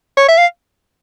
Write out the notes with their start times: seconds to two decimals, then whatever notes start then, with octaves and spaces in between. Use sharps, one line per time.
0.17 C#5
0.29 E5
0.38 F5